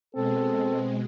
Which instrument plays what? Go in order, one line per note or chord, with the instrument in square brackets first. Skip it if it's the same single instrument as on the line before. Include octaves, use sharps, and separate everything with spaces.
[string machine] B2 G#3 [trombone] C4 [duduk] A4